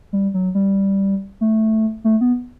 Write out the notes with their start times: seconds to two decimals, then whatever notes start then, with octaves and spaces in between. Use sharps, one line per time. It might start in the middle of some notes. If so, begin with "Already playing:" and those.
0.13 G3
0.34 F#3
0.55 G3
1.41 A3
2.04 A3
2.21 B3